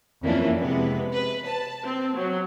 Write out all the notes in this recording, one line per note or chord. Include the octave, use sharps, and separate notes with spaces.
F2 E3 A#3 C#4 D4
C3 G#3 B3 B4
B4
A5
C4
F#3